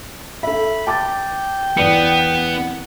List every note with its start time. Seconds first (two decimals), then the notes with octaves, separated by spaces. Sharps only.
0.43 A4 E5 B5
0.87 G5 A5 D6 A6
1.77 E2 B3 D5 C#7